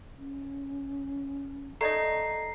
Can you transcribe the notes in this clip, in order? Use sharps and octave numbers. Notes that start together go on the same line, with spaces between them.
C#4
A3 D#4 A4 D5 D#5 A#5 C7